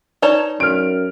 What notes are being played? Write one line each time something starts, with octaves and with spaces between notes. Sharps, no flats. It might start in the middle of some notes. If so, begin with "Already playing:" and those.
D#4 B4 C#5 D5 A5
F#2 F6 D7